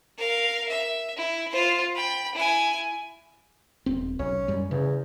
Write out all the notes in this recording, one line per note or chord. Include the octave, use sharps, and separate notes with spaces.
A#4 F5
E5
E4
F4 C5
G5 B5
E4 G#5
D#1 C4
B1 C#4
F#2 G3
E2 C#3